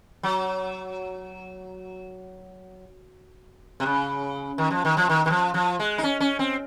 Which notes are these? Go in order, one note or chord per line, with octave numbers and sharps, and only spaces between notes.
F#3
C3
C#3
D#3
F3
D#3
F3
D#3
D#3
F3
F3
G#3
D#4
C#4
C#4
C4